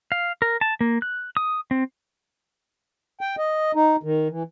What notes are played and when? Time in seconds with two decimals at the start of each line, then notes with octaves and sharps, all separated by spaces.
0.12 F5
0.42 A#4
0.61 A5
0.81 A#3
1.02 F#6
1.37 D#6
1.71 C4
3.21 G5
3.38 D#5
3.75 D#4
4.03 D#3
4.30 E3